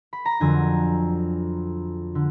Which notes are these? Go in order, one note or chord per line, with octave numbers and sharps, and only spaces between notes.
B5
A#5
F2 D3 F#3 D4 G#5
D3